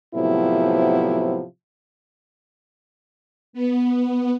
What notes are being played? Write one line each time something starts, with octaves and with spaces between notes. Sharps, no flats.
A2 C3 F3 F#3 B3 E4
B3